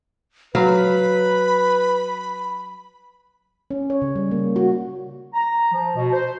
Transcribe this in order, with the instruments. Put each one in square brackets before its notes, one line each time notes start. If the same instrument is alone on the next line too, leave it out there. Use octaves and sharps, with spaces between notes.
[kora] F#3 F5 [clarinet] B4 [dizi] B5
[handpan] C#4
C#5
C#3
G3
A#3
F#4
[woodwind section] A#5
F3
B2
C5